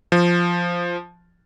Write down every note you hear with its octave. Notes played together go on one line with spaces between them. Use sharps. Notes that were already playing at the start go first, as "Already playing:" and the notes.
F3